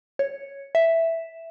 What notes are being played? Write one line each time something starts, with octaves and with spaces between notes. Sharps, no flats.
C#5
E5